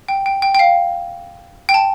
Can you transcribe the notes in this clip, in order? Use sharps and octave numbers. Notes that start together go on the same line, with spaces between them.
G5
G5
G5
G5
F5
G5
A5